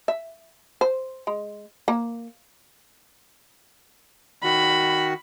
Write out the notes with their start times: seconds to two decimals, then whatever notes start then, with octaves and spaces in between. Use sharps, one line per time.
0.08 E5
0.81 C5
1.27 G#3
1.88 A#3
4.44 D#3 F#4 B5